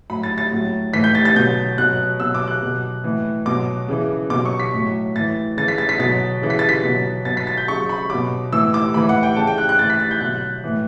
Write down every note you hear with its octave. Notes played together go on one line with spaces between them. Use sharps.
A2 F#3 B5
A6
A6
A2 F#3
A2 E3 B6
G6
A6
A6
B2 F#3 G6
B2 F#3 F#6
B2 F#3 E6
D6
F#6
B2 F#3
A2 E3
B2 F#3 D6
C#3 E3
B2 F#3 D6
C#6
B6
A2 F#3
A2 E3 A6
C#3 E3 A6
B6
A6
B6
B2 F#3 A6
C#3 E3
B6
A6
B6
B2 F#3
B2 F#3 A6
B6
A6
G6
C#3 F#3 C#6
B5
B2 F#3 D6
A2 E3 E6
D6
A2 E3 B5
F#5
G5
C#3 E3 A5
G5
F#6
F#6
A2 E3 A6
B6
A6
G6
B2 F#3 F#6
A2 E3